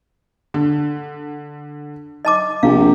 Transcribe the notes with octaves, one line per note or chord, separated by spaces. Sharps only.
D3
D#5 A5 D6
A#1 C3 F5